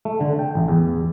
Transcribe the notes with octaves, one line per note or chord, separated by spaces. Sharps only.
A3
D3
G5
A1
E2